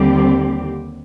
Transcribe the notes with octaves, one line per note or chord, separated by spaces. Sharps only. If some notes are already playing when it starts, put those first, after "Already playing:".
Already playing: D#2 D3 G3 C4 G4